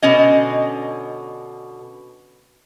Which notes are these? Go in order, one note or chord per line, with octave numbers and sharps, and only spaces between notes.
B2 D3 C#4 D#5